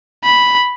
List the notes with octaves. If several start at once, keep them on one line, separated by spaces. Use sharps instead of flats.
B5